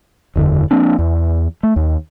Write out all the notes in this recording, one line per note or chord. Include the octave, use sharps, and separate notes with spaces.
F#1 E2 D3
F3 A#3 C4 D4
E2
A3
D#2